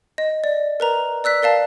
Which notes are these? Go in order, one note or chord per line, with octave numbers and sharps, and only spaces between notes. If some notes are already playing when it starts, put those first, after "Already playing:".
D#5
D5
A#4 B4 A#5
D5 E6 F#6 B6
A#4 D5 F5 A5